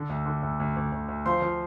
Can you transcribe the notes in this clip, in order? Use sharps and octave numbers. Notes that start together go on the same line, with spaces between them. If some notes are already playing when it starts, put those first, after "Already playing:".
Already playing: D3
D2
D3
D2
D2
D2
D2
D2
F3 C5 C6
F3